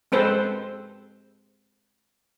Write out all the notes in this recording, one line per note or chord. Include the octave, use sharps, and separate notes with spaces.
G#3 C4 A4 B4 C5